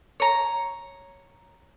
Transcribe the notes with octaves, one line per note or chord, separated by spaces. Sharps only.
C#5 A#5